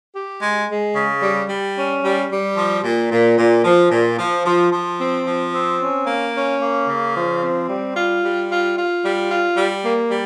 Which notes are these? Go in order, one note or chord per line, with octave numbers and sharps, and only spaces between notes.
G4
G#3
G#3
C#3
G3
G3
C#4
G3
G3
F3
A#2
A#2
A#2
F3
A#2
F3
F3
F3
C4
F3
C4
C#4
A#3
C#4
A#3
C#3
F3
C4
G3
F4
G3
F4
F4
G3
F4
G3
A#3
G3